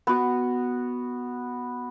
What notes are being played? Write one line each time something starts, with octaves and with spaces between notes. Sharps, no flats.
B3 F#4